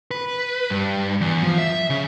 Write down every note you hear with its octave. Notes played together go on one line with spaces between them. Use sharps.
B4
G2
E2
F3
E5
C#3